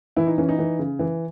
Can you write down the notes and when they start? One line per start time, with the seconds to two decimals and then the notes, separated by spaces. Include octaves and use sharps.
0.16 E3 E4
0.27 D#4
0.38 E3 C#4
0.49 D#4
0.59 E3
0.79 C#3
0.99 E3